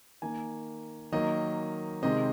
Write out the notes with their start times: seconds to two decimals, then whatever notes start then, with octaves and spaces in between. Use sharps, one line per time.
0.22 D#3 A#3 G#5
1.12 D#3 F#3 A#3 D#5
2.03 C3 D#3 G#3 C4 D#5